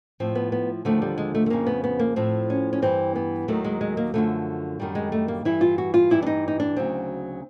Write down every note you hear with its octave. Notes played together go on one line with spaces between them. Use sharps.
A2 F3 C4
B3
B3
D#2 D3 F3 A3
G3
G#3
A3
A3
F2 C#3 F3 A#3
B3
B3
A#3
A2 F3 C4
C#4
C#4
G2 E3 G3 C4
B3
D#2 D#3 F#3 A3
G#3
G#3
A#3
F#2 D3 F3 A3
F#2 D#3 G3
G#3
A3
A#3
G2 E3 G3 E4
F4
F#4
F4
G2 E3 G3 E4
D4
D#4
D#4
D4
D2 C#3 F#3 C4